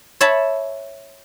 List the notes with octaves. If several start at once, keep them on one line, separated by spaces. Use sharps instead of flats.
C#5 E5 A5 B5